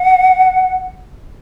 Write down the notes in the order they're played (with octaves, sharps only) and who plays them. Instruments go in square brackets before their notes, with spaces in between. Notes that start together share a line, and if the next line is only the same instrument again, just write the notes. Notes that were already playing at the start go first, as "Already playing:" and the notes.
Already playing: [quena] F#5